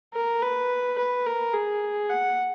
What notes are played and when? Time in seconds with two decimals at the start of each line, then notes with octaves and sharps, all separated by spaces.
0.14 A#4
0.42 B4
0.98 B4
1.26 A#4
1.54 G#4
2.10 F#5